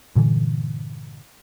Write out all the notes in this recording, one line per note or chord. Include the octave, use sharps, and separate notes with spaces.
G2 A#2 D3 E3